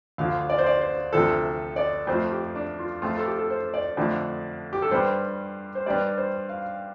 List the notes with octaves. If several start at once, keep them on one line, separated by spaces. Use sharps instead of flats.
D2 D3 F3 F5
D5
C5
D5
C5
D2 C3 F3 A4
D5
F2 F3 A3 C5
G4
D4
F4
F2 F3 A3 F4
A4
G4
A4
C5
D5
F2 D3 F3 A3
G4
A4
G2 G3 C5
C5
G2 G3 D5
C5
F5